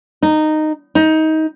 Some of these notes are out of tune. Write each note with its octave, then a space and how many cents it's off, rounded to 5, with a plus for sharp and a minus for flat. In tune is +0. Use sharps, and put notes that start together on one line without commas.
D#4 -10
D#4 +20